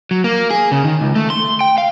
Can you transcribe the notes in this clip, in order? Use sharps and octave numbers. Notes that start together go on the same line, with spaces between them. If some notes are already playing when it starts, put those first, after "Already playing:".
F#3
A#3
G#4
C#3
D#3
C#2
A3
C6
G5
F5